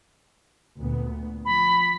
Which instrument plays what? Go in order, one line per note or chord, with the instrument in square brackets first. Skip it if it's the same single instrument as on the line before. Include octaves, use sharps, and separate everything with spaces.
[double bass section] D2 A#2 B3
[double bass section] F3 [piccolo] B5